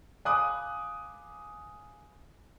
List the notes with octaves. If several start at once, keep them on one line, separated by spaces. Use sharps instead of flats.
F5 G#5 B5 D6 D#6 F#6